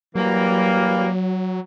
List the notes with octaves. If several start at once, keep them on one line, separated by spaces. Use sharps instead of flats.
E3 F#3 G3 A#3